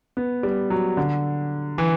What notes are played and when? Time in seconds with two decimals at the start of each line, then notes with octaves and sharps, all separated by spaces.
0.17 B3
0.43 G3
0.70 F#3
0.97 D3
1.78 E3